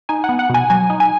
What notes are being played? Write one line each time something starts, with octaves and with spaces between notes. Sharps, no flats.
D#4 G#5
F#5
B3
F#5
B2 G#5
F#3 G#5
D#4
G#5